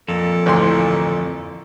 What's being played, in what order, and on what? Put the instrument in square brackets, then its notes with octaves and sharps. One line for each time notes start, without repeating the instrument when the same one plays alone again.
[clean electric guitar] F2 [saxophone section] A#2 A#3 A4
[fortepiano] A1 D2 C6